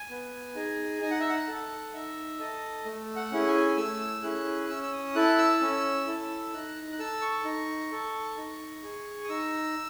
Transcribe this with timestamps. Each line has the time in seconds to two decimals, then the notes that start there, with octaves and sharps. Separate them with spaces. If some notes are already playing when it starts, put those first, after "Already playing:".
Already playing: G#5
0.10 B3
0.55 D#4 G#4
1.01 D#4 G#5
1.11 F#5
1.20 E5
1.29 F#5
1.48 A4
1.93 D#4 E5
2.39 A4 D#5
2.85 A3
3.16 F#5
3.32 C#4 E4 G#4
3.47 G#5
3.77 A3 E6
4.23 C#4 E4 G#4 F#6
4.69 C#4 E6
4.83 E6
4.93 D#6
5.15 E4 A4 F#6
5.38 E6
5.61 C#4
6.07 E4 A4
6.54 D#4 F#6
6.92 F#6
6.99 A4 E6
7.22 C#6
7.45 D#4
7.92 A4
8.37 D#4
8.83 G#4
9.24 D#6
9.29 D#4 E6